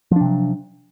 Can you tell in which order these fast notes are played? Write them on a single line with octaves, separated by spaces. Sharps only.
F3 D4 C3 F#3